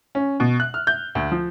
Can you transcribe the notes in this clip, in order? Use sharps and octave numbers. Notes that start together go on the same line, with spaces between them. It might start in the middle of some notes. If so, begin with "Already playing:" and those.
C#4
B2
F#6
F6
G6
D2
F3